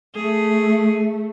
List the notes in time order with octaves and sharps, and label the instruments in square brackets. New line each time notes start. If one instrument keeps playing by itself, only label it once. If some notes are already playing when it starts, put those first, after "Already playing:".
[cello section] A3 [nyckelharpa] G#4